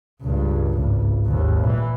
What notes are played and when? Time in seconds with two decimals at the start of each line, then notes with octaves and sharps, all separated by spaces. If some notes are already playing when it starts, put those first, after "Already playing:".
0.22 C#2 G2
0.67 G#1 C#2
1.25 G#1 D#2
1.63 A#2 E3